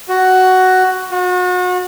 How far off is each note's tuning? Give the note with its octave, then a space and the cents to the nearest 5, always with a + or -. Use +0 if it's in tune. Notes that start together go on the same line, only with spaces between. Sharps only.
F#4 +10
F#4 -35